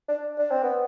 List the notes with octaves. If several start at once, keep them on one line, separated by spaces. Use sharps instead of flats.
D4
D4
C4
B3